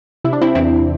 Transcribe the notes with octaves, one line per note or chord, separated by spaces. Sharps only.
C3 E4
D4
C4 E4
E2 C4 E4